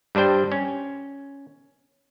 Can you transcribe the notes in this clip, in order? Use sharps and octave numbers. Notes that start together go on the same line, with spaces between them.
G2 G3 D4 C5 G5
C#4